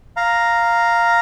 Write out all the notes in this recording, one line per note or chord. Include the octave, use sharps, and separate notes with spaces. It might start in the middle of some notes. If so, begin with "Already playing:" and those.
F5 A#5